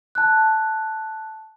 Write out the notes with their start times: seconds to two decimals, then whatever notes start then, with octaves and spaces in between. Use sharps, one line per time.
0.15 A5 F#6